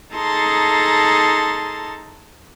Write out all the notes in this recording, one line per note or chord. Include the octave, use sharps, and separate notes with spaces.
D#4 G#4 A4 A5 A#5 C6